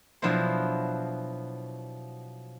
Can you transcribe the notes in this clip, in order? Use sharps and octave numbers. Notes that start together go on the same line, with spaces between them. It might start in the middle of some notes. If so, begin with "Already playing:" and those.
B2 F3 F#3 D4 E4 C5